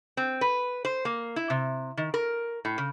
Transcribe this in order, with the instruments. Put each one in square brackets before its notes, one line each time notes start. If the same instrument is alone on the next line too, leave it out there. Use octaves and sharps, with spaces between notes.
[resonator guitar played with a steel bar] C4
B4
C5
A#3
E4
C3
D#3
A#4
A2
C#3